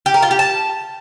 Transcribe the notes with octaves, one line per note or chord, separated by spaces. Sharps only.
G4
A#4
F4
G4
A5